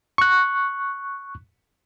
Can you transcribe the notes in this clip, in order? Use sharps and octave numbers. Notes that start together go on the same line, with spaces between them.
C#6 F#6